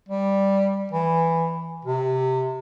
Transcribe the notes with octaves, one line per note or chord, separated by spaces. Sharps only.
G3
E3
C3